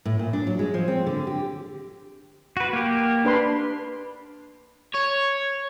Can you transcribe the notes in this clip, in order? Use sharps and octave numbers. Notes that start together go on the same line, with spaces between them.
A2
A#2
D4
F#3
G#3
F3
C4
D3
G4
F#4 B4
A#3 G4
D4 B4 C6
C#5